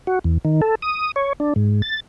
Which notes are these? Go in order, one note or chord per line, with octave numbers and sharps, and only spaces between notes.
F#4
E2
D#3
A4
D#6
C#5
D4
G#2
A6